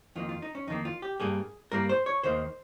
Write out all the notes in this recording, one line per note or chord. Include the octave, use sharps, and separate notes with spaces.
F2 D#3 A#3 F4
F4
D#4
C#4
F2 D#3 A#3 D#4
F4
G4
G2 G3 A#3 G#4
G2 G3 A#3 A#4
C5
C#5
D#2 D#3 A#3 C5